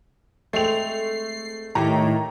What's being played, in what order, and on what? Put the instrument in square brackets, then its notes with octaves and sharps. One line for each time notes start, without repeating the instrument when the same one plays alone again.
[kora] G#3 C4 [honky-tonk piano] A3 F7 [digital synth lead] C7
[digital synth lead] A2 [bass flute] D#3 [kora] G4 C#5 [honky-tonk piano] A#5